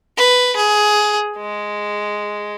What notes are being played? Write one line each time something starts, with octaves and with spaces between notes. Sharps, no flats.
B4
G#4
G#3